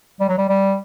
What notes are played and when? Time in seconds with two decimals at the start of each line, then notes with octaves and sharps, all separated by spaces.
0.20 G3
0.29 F#3
0.38 G3
0.49 G3